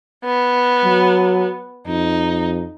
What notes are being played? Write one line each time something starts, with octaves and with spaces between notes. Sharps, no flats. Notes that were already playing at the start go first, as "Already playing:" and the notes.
B3
F#3
F2 D#4